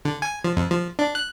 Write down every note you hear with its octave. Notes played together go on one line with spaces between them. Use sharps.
D3
G#5
F3
F2
F3
D4
F#6